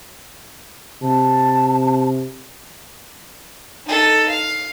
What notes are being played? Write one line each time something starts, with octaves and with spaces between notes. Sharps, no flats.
C3 A5
D#4 A4
F5